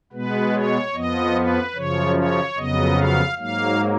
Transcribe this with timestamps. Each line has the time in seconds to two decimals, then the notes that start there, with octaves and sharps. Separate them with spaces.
0.12 B2 G#3 B3 B4
0.53 C#5
0.93 F2 F3 B3 D#5
1.35 B4
1.75 F#2 C#3 F3 C#5
2.16 C#5
2.56 F2 C#3 F#3 B3 D#5
2.98 F5
3.38 G#2 F#3 A#3 F5